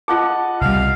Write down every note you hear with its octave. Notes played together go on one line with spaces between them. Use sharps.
F4 G#4 D#5 F#5 A5
C2 G3 F5